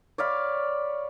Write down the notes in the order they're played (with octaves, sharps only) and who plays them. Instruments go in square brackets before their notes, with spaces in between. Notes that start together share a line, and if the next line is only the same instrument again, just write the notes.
[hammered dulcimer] C#5 D5 F5 B5